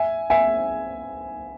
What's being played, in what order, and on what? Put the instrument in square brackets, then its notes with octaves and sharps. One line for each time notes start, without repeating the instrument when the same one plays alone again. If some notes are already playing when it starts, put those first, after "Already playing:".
Already playing: [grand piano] E5 G#5
E5 G#5